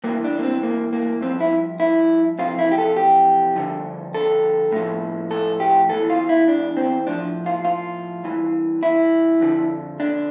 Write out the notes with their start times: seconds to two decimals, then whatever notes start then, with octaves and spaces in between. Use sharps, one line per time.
0.04 G2 E3 A#3
0.24 D4
0.39 A#3
0.43 C4
0.63 A#3
0.93 A#3
1.21 G2 F3 C4
1.40 E4
1.80 E4
2.39 F2 C3 E3 F4
2.59 E4
2.72 G4
2.78 A4
2.97 G4
3.56 G2 D3 F3
4.14 A4
4.72 A2 F3
5.31 A4
5.60 G4
5.89 E2 E3 A4
6.10 F4
6.29 E4
6.48 D4
6.77 C4
7.07 A2 F3 D4
7.46 F4
7.65 F4
8.24 G2 E3
8.83 E4
9.40 F2 D3 F3
10.00 D4